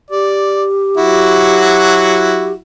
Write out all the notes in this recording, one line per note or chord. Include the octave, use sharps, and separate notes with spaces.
G4 D5
F#3 E4 F#4